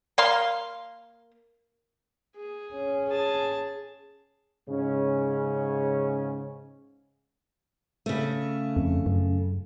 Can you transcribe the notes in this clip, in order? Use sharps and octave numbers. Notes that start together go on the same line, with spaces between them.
A#3 F5 C6
G#4
C#4
G#4 A5
G#2 C#3 C#4
C#3 A3
F2
F#2